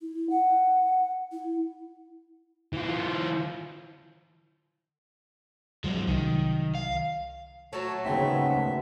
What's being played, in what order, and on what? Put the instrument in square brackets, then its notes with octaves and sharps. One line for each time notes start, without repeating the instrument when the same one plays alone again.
[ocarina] E4
F#5
E4
[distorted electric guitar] E3 F4
[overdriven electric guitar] G#2 F3 [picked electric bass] F#3 G#3
[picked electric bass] C2 F#3 [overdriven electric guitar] D#3
[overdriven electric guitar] F5
[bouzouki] F#3 A3 [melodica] C#5 A5
[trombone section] D#2 G#2 B3 [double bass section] C#3 [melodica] C4 E5
[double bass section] D2 [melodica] E5